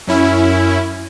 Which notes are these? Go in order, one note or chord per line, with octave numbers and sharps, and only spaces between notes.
F#2 C#4 E4